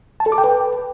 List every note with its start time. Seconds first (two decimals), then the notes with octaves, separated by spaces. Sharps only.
0.20 A5
0.26 A4
0.32 D6
0.38 G5
0.44 B4